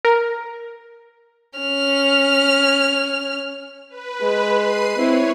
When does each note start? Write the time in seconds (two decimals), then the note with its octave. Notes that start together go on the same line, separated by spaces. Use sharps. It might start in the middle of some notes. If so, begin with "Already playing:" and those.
0.05 A#4
1.59 C#4 F6
3.89 B4
4.21 G#3
4.54 C7 D#7
4.97 C4 E4 C#5